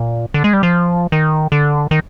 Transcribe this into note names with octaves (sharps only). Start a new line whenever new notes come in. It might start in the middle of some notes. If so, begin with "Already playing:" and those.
Already playing: A#2
D3
G#3
G3
F3
D#3
D3
D#3